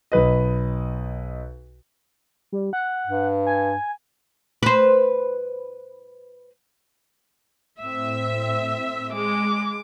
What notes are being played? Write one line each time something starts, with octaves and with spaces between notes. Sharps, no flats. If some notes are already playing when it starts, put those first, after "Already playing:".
B1 B4 D#5
G3
F#5
G2
G#5
B4 C5
A2 C4 E5
G#3 D6